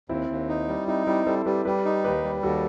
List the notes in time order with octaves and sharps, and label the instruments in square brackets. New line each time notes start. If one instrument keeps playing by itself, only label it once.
[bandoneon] D#2 [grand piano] C4 E4
[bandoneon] D#2
D#4
G3
[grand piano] C4 E4 [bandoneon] D#4
[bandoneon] G3 [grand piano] C4 E4
[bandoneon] G3 [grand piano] A4 C5
[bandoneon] G3 [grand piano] G4 B4
[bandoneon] G3 [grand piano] G4 B4
[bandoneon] D#4
[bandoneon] D#2 [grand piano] G4 B4
[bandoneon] G3
[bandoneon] D#2 [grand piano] F#4 A4